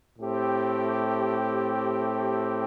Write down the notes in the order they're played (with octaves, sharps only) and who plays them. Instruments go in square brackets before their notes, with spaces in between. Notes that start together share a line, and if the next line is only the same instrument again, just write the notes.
[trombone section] A2 A3 C4 G4